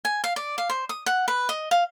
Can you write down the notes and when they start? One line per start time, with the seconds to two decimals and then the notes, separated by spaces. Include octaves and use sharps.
0.05 G#5
0.24 F5
0.36 D5
0.58 F5
0.69 C5
0.89 D#6
1.06 F#5
1.28 B4
1.49 D#5
1.71 F5